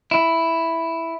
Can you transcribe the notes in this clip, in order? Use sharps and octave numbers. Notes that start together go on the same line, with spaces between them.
E4